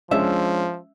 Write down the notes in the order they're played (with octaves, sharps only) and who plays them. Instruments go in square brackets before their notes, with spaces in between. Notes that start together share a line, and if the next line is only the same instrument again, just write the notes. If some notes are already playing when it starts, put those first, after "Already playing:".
[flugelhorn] F3 [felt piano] G#3 C#4 D4 [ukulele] E5